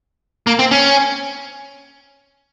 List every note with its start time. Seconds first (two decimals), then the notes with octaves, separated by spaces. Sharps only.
0.47 A#3
0.59 C4
0.71 C#4